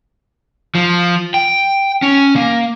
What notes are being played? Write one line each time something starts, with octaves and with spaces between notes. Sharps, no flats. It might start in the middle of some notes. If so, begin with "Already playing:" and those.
F3
G5
C#4
A#3